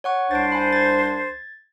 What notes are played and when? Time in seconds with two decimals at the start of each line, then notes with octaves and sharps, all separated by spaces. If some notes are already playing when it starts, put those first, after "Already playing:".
0.04 C#5 F#5 C#6
0.31 C2 D4 C5 A6 D7
0.52 G#5 B5
0.72 G#6 A6